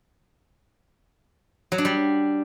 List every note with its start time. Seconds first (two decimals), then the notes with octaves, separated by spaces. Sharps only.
1.72 F#3
1.78 D4
1.85 G3